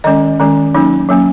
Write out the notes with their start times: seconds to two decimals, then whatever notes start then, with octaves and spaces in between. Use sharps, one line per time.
0.04 D#3 G#3 C#4 D#5
0.39 D#3 G#3 C#4
0.74 F#3 A#3 C#4 D#4
1.09 F#3 A#3 C#4